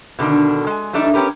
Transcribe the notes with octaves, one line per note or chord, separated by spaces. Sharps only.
B2 D3 D#3 D4
G#3 G#5
E3 G3 A3 D4 D#4
B3 C#4 F4 G4 A#4 B4